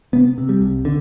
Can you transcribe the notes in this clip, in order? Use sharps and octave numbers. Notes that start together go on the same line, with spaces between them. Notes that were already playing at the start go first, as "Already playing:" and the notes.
C3 B3
C3
G3
C2
D3